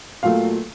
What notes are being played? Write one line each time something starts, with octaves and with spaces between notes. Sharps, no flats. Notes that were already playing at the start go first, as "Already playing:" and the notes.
A#2 F#3 A3 F5